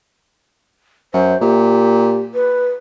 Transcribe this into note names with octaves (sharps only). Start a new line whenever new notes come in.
F#2 C5
A#2 G4
B4